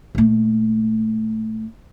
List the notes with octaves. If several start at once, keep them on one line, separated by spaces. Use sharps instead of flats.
A#2 A3